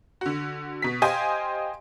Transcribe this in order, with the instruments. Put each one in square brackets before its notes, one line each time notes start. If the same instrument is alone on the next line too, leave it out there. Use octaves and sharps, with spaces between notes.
[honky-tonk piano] D3 F#4
B2 B6
G4 C5 D#5 F5 G#5